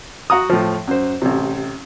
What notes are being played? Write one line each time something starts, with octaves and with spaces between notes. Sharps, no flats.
F#4 F#5 A#5 D#6
A2 F3
F#2 C5
A1 C3